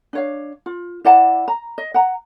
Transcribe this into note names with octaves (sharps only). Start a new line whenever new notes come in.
D4 C#5 F5
F4
E4 D5 F#5 A5
A#5
D#5
F#5 A#5